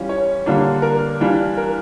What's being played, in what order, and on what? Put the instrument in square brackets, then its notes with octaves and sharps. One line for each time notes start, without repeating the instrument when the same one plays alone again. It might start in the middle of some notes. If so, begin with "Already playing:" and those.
Already playing: [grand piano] E3 G3 C#4 F4
C#5
D3 G3 A#3 D4 F4
A#4
E3 G3 D4 F4
A#4